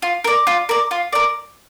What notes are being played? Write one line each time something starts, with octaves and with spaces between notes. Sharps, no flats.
F4
A#4 D5
F4
A#4 D5
F4
A#4 D5